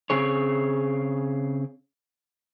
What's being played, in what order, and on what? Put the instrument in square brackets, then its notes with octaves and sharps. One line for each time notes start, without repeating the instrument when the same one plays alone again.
[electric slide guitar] C#3 C4 G#4 C#5